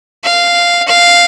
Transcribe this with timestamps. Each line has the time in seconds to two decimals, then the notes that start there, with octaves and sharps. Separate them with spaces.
0.24 F5
0.88 F5